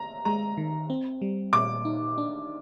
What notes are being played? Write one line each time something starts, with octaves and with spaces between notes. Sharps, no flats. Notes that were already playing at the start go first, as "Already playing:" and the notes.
Already playing: A#5
G#3 A#5
D#3
C4
G3
A#2 D6
D#4
D4